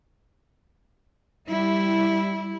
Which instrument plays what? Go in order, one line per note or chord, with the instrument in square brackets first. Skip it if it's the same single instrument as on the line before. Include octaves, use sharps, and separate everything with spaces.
[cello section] G3 E4